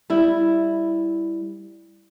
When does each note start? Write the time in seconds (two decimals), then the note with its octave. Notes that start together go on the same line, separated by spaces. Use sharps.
0.10 G3 E4